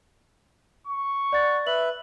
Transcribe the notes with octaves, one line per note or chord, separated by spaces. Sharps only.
C#6
D5 F#5 A6
B4 E5 F#7